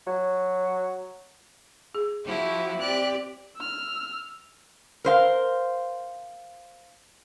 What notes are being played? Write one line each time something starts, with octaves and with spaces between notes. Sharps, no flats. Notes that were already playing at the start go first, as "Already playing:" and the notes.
F#3
G#4
F3 E4 F#4 G4
C4 G4 D5 F#6
E6 F6
A#4 C5 F5